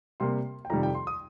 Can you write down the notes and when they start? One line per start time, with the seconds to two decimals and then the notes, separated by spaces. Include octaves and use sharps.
0.20 C3 G3 A#3 C6
0.65 G5
0.70 F2 C3 D#3 G3 A#5
0.83 G5
0.95 C6
1.07 D#6